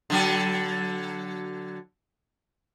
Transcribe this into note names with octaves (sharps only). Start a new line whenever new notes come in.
D3 F#3 A4